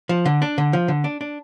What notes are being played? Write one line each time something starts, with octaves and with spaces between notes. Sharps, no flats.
F3
D3
D4
D3
F3
D3
D4
D4